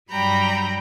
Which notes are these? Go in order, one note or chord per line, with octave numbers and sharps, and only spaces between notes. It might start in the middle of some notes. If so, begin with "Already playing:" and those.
G2 F#3 G3 G5 A#5 B5